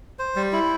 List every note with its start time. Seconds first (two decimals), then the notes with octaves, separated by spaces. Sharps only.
0.19 C5
0.36 G3
0.53 E4